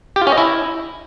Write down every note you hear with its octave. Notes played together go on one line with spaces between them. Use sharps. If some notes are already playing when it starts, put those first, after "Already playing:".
G4
F4
C#4
D#5
E4